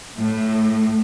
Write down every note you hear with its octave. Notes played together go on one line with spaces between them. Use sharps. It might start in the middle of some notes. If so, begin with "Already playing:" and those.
A2